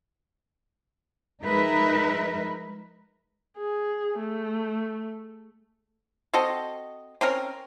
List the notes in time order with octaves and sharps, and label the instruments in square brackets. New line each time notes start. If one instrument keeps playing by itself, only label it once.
[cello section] F3 G#3 D#4 A#4 B4 E5
[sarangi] G#4
A3
[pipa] C4 F#4 A4 D#5
C4 C#4 A#4